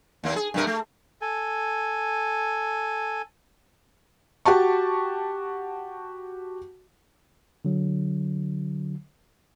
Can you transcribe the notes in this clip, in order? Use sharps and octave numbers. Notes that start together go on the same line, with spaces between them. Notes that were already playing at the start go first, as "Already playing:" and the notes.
D#2 A#3 C4
G#4
G2 C3 A#4
A3
A4 G#5
F#4 G4 A5 C#6
D3 F#3